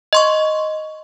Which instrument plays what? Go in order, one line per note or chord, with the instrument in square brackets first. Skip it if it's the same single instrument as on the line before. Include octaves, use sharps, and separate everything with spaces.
[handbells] D#5 C6 C#6